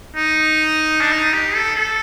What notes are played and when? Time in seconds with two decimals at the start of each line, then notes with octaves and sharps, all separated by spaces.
0.16 D#4
1.01 D4
1.12 D#4
1.34 G4
1.55 A4
1.76 A4